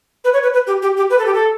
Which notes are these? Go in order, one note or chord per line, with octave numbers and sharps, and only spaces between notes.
B4
C#5
B4
B4
G4
G4
G4
B4
A4
G4
A4